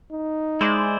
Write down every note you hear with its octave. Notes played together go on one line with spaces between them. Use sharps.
D#4
G#3 E4 C5 D5